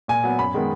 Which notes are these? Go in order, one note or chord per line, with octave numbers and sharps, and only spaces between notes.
A#2 G#5
F#3 B3
F#2 B5
D#3 G#3 B3